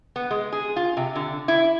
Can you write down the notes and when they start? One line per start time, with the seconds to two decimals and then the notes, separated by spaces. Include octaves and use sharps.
0.16 B3
0.31 G#3
0.52 G#4
0.76 F4
0.97 C3
1.15 D3
1.48 E4